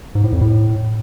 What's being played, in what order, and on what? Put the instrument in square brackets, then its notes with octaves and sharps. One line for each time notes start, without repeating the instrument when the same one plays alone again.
[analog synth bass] G#2
A2
F2
A2